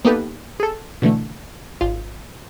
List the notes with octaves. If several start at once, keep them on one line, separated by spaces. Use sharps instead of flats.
A#3 B3 D#4 G4 A4 B4
G#4 A4
B2 D3 E3 A3
G#1 F4